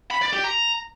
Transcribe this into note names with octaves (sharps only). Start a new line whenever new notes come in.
B5
D5
G4
A#5